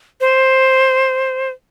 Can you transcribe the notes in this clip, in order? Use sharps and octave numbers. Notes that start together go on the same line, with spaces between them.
C5